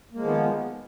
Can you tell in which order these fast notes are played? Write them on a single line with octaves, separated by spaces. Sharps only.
A#3 G#3 F3 D#3 B3